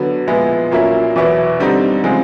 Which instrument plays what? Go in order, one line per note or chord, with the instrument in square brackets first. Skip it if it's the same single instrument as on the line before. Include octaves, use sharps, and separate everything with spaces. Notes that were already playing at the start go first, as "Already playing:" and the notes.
Already playing: [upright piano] D3 F#3 B3
A#2 F3 G#3 B3 E4
A#2 F#3 A#3 C#4 E4
E2 B2 F#3 B3 E4
D3 G3 C4 D#4
C#3 F3 G#3 C4